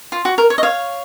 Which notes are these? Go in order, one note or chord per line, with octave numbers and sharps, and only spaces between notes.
F4
F#4
A#4
C#5
D#5
C#5 F5